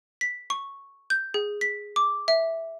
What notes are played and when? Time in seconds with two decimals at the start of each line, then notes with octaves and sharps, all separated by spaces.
0.21 B6
0.50 C#6
1.10 G6
1.34 G#4
1.61 B6
1.96 D6
2.28 E5